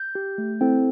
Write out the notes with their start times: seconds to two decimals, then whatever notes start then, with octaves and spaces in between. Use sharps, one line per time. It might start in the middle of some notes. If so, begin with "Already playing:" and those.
Already playing: G6
0.15 G4
0.38 A3
0.61 C4 E4 A4